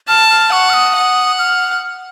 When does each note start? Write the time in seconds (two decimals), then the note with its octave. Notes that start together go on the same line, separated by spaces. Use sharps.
0.08 A5 F6
0.30 F6
0.52 F#5 C#6
0.70 F6
0.74 D#6
0.95 F#5
1.39 F6